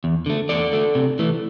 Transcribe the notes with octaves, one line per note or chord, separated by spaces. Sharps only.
E2
D3 A3
E2 A4 D5
D3 A3
C3
E3 A3